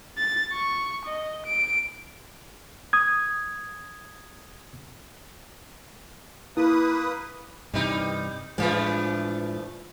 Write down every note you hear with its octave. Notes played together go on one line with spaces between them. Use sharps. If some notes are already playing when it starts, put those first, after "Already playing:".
A6
C#6
D#5
D7
D#6 G#6
A#3 E4 B4 D#6
G2 C3 E3 G3 D#4
A2 E3 F3 G#3 A3 D4 F4 B4